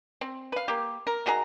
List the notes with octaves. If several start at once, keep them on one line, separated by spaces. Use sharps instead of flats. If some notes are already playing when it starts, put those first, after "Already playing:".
C4
B4 F5
A#3 G4
A#4
D#3 F#4 G#4 A#5